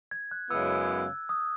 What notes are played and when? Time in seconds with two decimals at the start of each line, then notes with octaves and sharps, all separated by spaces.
0.11 G#6
0.31 F#6
0.50 F#2 C#3 G#3 B3 E4 E6
1.29 D#6